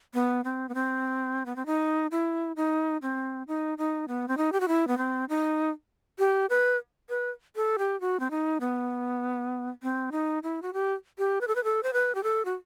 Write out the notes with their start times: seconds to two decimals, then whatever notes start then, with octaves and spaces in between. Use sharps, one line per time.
0.14 B3
0.44 C4
0.69 B3
0.74 C4
1.46 B3
1.56 C4
1.66 D#4
2.11 E4
2.56 D#4
3.02 C4
3.48 D#4
3.78 D#4
4.08 B3
4.28 C4
4.37 D#4
4.52 G4
4.60 F#4
4.68 E4
4.88 B3
4.98 C4
5.29 D#4
6.19 G4
6.50 B4
7.09 B4
7.56 A4
7.78 G4
8.01 F#4
8.20 C4
8.31 D#4
8.61 B3
9.83 C4
10.12 D#4
10.43 E4
10.62 F#4
10.73 G4
11.18 G4
11.41 B4
11.48 A4
11.55 B4
11.64 A4
11.83 C5
11.93 B4
12.15 G4
12.23 A4
12.45 F#4